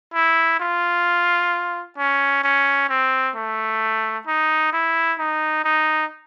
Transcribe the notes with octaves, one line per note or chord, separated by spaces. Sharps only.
E4
F4
C#4
C#4
C4
A3
D#4
E4
D#4
D#4